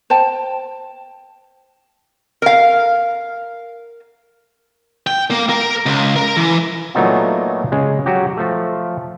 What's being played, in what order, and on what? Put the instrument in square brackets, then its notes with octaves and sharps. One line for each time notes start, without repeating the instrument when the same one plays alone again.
[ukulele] C5 G5 A5
[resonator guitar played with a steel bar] A#4 F5
[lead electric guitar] G5
A#3
A#4
C#2
A#4
E3
[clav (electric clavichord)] A#2 F#3 A3 B3 D#4 F4
C#3 G#3
F#3 F#4 G4
F3 A3